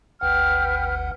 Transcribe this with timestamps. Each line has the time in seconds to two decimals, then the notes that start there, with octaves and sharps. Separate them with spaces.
0.21 G1 D2 B4 F#5 G5 F6